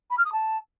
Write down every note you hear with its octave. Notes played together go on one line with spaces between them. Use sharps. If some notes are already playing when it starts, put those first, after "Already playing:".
B5
F6
D#6
A5